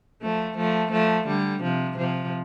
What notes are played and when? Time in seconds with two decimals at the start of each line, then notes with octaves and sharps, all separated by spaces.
0.22 F3 A3
0.57 F3 A3
0.92 F3 A3
1.27 D3 G3
1.62 C3 F3
1.97 C3 F3